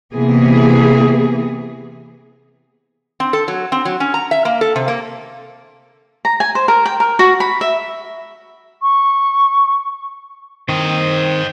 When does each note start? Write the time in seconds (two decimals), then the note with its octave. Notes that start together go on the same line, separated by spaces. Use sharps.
0.14 C3 E3 A#3 B3 G#4
3.20 C4
3.33 A4
3.48 F#3
3.72 C4
3.85 F#3
4.00 C#4
4.14 A#5
4.31 E5
4.45 A#3
4.61 A4
4.76 C3
4.88 A#3
6.25 A#5
6.40 G#5
6.55 C5
6.68 A#4
6.85 G5
7.00 A#4
7.19 F#4
7.40 B5
7.61 E5
8.82 C#6
10.69 D#3 C4 C5 D#5